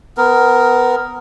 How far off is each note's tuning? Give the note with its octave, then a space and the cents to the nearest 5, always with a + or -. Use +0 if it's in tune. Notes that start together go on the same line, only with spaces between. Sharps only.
B3 +20 A#4 +0